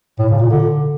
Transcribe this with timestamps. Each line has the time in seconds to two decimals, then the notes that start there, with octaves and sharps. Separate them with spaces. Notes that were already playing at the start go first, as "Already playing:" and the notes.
0.19 A2
0.30 C#3
0.40 A#2
0.50 D3